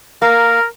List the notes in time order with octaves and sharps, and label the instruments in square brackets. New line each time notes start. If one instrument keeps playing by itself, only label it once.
[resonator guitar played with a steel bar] A#3 [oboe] A#4